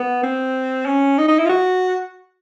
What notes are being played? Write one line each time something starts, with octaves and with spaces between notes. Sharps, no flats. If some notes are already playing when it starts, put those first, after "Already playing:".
Already playing: B3
C4
C#4
D#4
D#4
E4
F4
F#4